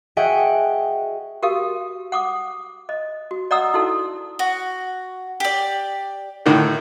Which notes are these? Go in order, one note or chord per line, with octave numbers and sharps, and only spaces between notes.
F#4 G#4 D#5 E5 F#5 G5
F#4 G4 A#4 F5 D#6
F#5 D6 D#6
D#5
F#4
D5 D#5 F#5 A#5 D#6 E6
D#4 E4 F#4 A4
F#4
G4 D5
A2 D3 D#3